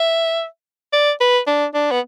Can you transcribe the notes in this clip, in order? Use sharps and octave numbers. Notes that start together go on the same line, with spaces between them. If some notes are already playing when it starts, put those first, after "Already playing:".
Already playing: E5
D5
B4
D4
D4
B3